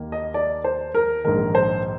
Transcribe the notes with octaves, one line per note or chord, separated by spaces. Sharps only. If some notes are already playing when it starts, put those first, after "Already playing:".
Already playing: D#2 D#3 A#3
D#5
D5
C5
A#4
A#1 G#2 D#3 A#4
C5